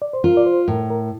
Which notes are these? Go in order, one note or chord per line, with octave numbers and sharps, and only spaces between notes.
D5
C5
F4 A#4
D5
C5
A2 A#4
A#4